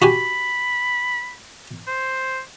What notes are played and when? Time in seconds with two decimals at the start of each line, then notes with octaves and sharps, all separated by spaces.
0.02 F#4 G4 G#5 B5
1.87 C5